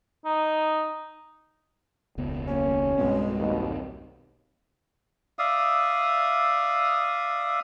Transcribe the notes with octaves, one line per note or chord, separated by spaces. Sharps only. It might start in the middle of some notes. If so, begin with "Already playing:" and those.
D#4
E1 C#2 B3
A#3 C#4
B1 G2 B2 G#3 C4
D#2 B2
D5 E5 F5 D#6